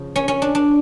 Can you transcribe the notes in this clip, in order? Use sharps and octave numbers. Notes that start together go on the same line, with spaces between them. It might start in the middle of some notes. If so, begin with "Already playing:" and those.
Already playing: C#3 F3
C#4
C#4
D4
D4